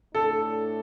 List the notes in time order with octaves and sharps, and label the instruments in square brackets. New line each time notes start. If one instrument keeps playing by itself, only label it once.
[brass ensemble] A2 A3 D4 [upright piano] A4